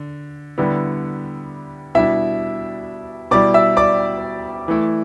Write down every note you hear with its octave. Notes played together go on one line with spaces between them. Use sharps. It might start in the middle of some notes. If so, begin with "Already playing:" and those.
Already playing: D3
D3 G3 B3 E4
B2 G3 D4 E4 E5
B2 G3 E4 D5 D6
E5 E6
D5 D6
E3 A3 E4